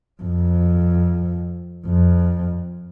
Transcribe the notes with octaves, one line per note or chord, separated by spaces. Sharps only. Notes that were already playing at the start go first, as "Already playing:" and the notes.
F2
F2